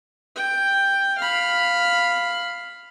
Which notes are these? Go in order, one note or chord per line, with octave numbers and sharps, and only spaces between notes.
G5
F5 B5